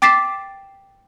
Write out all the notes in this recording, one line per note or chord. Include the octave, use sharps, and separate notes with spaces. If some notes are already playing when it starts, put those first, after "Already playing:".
G5 D6 A6 B6 C7 E7